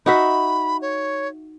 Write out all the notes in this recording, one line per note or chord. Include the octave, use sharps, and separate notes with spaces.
D#4 F#4 E5 B5
C#5